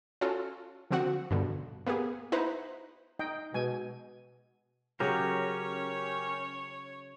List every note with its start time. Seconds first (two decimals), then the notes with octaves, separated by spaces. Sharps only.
0.21 C#4 F4 F#4 A4
0.91 D3 F3 C4 F#4 F#5
1.31 G2 B2 D3
1.86 A#3 B3 G4 G#4
2.32 D#4 E4 B4 C5 F#5 A#5
3.19 D#4 D#5 G5
3.54 B2 G#3 G#5
5.00 C#3 F#3 C#4 G4 A#4 C#5